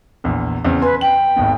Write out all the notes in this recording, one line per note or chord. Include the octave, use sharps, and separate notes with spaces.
A#1 E2
E2 C#3 C4
B4 G#5 C6
G5 F#7
G#1 D#2 B3